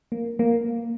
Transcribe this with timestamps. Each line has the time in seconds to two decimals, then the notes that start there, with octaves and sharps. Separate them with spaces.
0.12 A#3
0.39 A#3